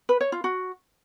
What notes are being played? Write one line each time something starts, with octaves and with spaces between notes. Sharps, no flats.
B4
C#5
F4
F#4